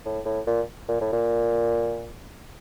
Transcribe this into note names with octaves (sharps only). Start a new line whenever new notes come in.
A2
A2
A#2
A#2
A2
A#2